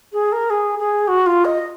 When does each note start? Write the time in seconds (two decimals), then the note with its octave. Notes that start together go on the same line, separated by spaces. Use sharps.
0.12 G#4
0.32 A#4
0.50 G#4
0.79 G#4
1.07 F#4
1.26 F4
1.44 D#5